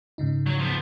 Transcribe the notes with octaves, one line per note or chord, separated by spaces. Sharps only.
G#2 C#3 D#4
F#3
F3 B3